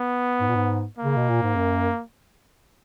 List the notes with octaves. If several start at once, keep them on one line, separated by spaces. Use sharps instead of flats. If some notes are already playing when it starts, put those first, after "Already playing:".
Already playing: B3
G#2
A#2
G#2
A#3
C#3
B2
A#2
G#2
F#2